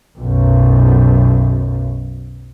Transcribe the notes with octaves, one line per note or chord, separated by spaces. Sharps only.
B1 F#2